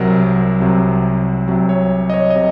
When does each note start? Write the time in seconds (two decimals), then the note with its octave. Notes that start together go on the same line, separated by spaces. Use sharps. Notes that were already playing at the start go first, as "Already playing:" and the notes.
Already playing: C2 C3 F#3 A#4
0.60 C2 C3 F#3
1.48 C2 C3 F#3
1.69 C#5
2.10 D#5
2.14 C#5
2.30 D#5
2.36 C3